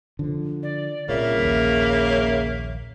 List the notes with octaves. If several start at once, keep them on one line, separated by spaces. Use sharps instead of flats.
D3 F3
D5
C2 A#2 C#3 A#3 E5
A#1 D#2